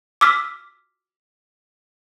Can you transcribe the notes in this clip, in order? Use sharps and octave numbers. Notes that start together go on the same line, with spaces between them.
D6 E6 F6 B6